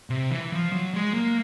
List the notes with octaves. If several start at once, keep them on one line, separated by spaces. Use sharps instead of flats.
C3
E3
F3
F#3
G#3
A#3